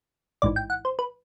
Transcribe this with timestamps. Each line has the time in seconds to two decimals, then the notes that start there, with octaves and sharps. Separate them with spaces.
0.42 A1 G#2 E3 D5
0.56 G5
0.70 F#5
0.85 C5
0.99 B4